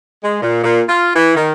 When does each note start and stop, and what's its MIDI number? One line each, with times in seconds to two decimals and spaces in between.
0.23 0.41 56
0.41 0.61 46
0.64 0.81 46
0.89 1.10 65
1.15 1.34 52
1.36 1.53 51